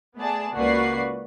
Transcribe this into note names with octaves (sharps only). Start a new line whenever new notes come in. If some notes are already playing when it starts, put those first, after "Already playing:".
A3 B3 G#4 D5 A5
C#2 A#3 F#4 B4 D5 C7